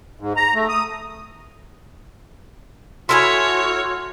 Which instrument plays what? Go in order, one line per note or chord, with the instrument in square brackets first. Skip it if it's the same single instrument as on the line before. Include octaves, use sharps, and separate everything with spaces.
[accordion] G#2
A#5
A3
D#6
[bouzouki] E4 A4 G#5 [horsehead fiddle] F#4 [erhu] C#5 [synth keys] C6 F6 G#6